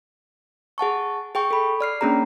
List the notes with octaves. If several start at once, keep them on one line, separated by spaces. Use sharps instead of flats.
G#4 F#5 A5 C#6
G#4 G5 C#6
A4 B5
D5 F6 C7
A#3 C#4 D4 G#4 A#5